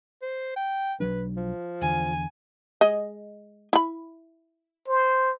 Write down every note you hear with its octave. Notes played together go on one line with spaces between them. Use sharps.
C5
G5
B1 F#3 D4 B4
F3
E2 D3 G#5
G#3 D#5
E4 B5
C5